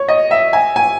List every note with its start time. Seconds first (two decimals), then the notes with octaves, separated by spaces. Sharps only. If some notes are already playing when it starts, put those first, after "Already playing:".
Already playing: C#5
0.08 D#5
0.31 E5
0.53 G#5
0.76 G#5